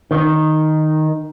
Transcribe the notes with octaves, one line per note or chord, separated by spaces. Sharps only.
D#3